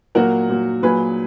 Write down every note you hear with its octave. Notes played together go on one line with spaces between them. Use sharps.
A#2 F#3 F#4 A#4
A#2 F#3
A#2 F#3 G#4 B4